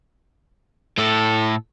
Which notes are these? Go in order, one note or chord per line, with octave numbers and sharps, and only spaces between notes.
A2 A4